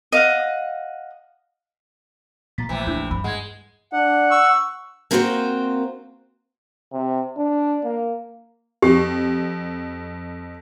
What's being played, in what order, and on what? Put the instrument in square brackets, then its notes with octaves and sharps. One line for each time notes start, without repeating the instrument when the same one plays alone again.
[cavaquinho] D#5 F5 F#5
[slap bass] A#2 A3 A#3 [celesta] A#5 A6 B6
[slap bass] A#1 A3 A#3 [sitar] C3 E3
[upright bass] F2 [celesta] D4 E4 G6
[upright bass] G2 [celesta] B5
[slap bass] D2 G#2 [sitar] G#3 [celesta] F#5 G#6
[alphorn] D4 [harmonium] F#5
[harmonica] C#6 E6
[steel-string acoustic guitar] A#3 C4 F4 F#4 A#4 C5
[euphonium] C3
D4
A#3
[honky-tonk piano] F2 [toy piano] G4